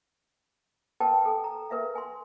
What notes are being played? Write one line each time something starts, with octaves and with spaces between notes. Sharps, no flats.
A#4 B4 G5 A5
A4 G#5
A#5
A#4 B4 E5 F5
G#5 C6